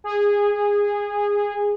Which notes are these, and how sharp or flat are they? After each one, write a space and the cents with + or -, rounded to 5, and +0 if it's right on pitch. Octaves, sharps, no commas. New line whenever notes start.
G#4 -15